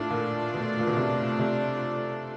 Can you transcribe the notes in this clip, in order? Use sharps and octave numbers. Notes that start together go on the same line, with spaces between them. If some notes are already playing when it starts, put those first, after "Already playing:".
Already playing: A2 A3 D4 F4 A4 D5
A#2
B2
A#2
B2
C3
C3